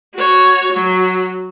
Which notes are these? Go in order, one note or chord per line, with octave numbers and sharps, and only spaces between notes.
F#4 C#5
F#3